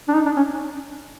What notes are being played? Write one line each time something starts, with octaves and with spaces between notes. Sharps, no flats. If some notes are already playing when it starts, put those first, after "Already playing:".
D4
D#4
D4
C#4